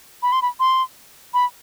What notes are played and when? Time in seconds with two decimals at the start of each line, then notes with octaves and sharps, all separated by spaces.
0.23 B5
0.32 C6
0.42 B5
0.60 C6
1.34 B5